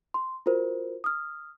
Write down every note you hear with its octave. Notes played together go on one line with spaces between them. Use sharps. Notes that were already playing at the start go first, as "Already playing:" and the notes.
C6
F4 F#4 A#4 C5
D#6 F6